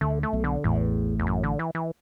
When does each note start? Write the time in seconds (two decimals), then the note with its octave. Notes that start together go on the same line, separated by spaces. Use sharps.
0.01 D2 D3 A3
0.23 A3
0.33 B1 B2
0.44 D3
0.64 A1 E2 A2
1.19 E2
1.27 F#2
1.43 D3
1.59 E3
1.75 E3